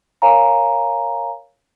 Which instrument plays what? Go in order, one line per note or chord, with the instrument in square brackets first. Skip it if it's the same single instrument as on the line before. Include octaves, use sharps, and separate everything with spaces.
[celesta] A#4 C#5 F5 G#5 A#5